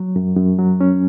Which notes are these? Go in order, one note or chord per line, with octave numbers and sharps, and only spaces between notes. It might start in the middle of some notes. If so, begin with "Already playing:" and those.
Already playing: F#3
F#2
F#2
F#3
C#4